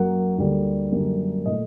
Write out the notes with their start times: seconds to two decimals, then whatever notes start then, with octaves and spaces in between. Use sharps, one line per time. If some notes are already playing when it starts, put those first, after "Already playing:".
Already playing: F#2 F#3 A#3 F#5
0.38 D2 D3 G3 A#3
0.92 F#2 D3 G3 A#3
1.45 A#2 A3 D#5